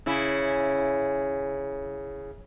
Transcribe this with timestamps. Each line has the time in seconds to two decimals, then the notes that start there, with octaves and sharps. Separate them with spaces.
0.06 C#3 E4